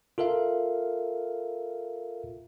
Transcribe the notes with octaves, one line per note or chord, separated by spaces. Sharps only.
F4 A4 A#4 E5 F5